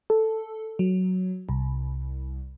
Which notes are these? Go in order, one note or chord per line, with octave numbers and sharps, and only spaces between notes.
A4
F#3
C2